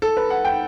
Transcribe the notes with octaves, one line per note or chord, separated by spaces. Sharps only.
A4
B4
F#5
G5